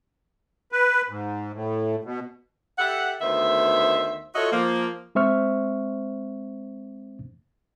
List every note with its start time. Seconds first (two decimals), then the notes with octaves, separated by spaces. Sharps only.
0.72 B4
1.09 G#2
1.54 A2
2.04 B2
2.79 G4 A4 E5 F#5
3.21 D2 D#3 B3 C5 E5
4.35 F4 F#4 A4 C#5 D#5 E5
4.52 F3 A#3
5.15 G#3 C4 C5 E5 C#6 F6